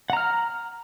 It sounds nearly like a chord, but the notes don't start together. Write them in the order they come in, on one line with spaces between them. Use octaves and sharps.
F#5 A#5 F6